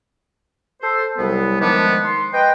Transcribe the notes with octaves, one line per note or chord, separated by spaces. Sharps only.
A4 C5
C2 F#3 G3 B3
D#3 F3 G#3 A3 B3 D4
C6
B4 D#5 G5